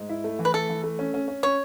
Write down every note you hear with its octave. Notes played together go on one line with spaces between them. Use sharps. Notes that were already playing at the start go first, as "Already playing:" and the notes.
Already playing: G#2
E4
A3
E3
B4
A3 A4
E3
A3
C#4
C#4
C#4
C#4 C#5